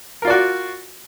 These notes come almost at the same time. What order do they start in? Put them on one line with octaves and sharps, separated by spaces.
A#4 F4 D5 F#4